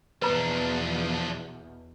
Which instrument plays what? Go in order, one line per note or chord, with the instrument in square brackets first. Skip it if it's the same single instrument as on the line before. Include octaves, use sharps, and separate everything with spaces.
[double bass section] E2 B2 [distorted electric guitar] F3 D4 [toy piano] B4 A#5